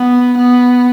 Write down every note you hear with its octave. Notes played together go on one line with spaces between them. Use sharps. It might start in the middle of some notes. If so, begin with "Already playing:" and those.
Already playing: B3
B3